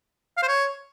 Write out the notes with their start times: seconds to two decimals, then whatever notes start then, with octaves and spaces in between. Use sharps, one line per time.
0.37 F5
0.43 C5
0.48 C#5